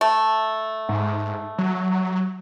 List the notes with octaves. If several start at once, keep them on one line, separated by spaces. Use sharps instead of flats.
A3
G#2
F#3